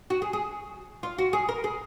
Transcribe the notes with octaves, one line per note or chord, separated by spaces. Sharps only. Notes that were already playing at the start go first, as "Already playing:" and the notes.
F#4
G#4
G#4
F4
F#4
G#4
A#4
G#4